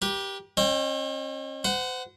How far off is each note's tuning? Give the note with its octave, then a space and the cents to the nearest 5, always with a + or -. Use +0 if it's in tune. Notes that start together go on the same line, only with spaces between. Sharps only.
G4 +0 B4 -45
C#4 -45 D#5 -30 G5 +0
C5 -35 F#5 +5